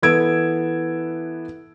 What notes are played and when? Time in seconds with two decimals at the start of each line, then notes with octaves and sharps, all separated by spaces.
0.02 E3 B3 A4 E6 G#6 D7